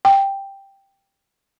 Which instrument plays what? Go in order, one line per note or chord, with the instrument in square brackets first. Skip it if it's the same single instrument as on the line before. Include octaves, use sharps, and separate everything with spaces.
[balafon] G5